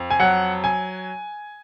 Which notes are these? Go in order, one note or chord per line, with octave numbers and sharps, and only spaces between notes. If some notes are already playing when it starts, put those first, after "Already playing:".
Already playing: F2
G#5
F#3 F#5
G#5